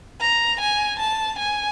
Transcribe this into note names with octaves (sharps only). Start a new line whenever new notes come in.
A#5
G#5
A5
G#5